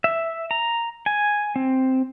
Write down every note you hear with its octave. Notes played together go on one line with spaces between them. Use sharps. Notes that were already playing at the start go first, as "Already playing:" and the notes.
E5
A#5
G#5
C4